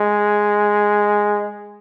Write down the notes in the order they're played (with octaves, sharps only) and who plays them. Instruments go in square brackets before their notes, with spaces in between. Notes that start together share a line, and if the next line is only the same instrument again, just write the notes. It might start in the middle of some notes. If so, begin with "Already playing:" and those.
Already playing: [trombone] G#3